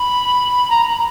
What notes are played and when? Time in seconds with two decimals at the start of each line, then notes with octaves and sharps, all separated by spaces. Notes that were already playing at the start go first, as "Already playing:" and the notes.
Already playing: B5
0.70 A#5
0.84 B5